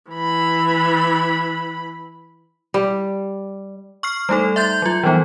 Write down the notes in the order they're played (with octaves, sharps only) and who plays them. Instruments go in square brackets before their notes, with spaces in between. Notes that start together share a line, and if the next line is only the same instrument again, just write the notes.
[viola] E3 B5
[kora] G3
[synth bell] C#6 F6 C7
G3 A3 D#4 A4
E5 C6 G6 A6
F#3 F4
E3 F3 G3 B3 D#4